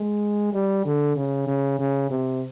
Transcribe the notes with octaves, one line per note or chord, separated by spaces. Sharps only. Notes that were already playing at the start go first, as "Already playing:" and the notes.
Already playing: G#3
G3
D3
C#3
C#3
C#3
C3